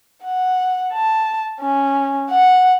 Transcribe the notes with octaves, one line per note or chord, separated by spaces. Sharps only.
F#5
A5
C#4
F#5